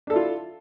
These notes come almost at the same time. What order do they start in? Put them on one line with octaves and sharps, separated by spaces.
D4 A4 E4 F4